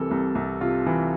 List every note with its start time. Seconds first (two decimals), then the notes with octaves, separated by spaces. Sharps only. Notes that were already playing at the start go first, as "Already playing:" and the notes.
Already playing: C2 C3 E3 A4 A#4
0.11 C2
0.35 C2
0.61 C3 F4
0.86 E3